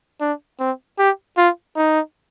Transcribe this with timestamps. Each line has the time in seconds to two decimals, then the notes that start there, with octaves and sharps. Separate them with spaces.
0.21 D4
0.59 C4
0.98 G4
1.37 F4
1.76 D#4